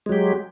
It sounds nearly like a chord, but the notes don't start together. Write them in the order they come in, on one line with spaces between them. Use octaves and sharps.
G#3 F#3 G4